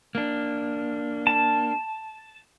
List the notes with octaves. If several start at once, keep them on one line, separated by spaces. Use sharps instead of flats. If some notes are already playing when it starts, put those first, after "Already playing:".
A#3 D4
A5